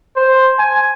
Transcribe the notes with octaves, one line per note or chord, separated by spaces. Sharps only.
C5
G#5